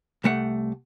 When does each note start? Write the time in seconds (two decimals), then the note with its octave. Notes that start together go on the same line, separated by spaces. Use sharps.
0.24 C2 A3 F#5